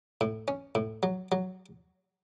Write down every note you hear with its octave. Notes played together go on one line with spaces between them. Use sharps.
A2
C#4
A2
F#3
F#3